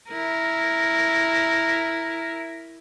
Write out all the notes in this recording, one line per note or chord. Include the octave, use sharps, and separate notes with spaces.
E4 A#4